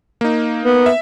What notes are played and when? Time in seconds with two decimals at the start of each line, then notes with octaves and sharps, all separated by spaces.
0.21 A#3 D#4
0.63 B3
0.86 E5